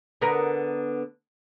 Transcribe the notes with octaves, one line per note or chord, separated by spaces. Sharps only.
D3 B3 A#4